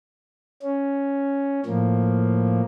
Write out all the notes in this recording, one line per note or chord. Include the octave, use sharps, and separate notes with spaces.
C#4
A2 F3 A#3